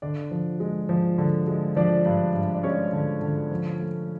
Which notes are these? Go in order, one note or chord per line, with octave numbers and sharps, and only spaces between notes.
D3 D4 D5
F3
G#3
F3
D3
G#3
F3 D4 D5
G2
G2
D5
G#3 C#4 C#5
D3
D3
F3
A3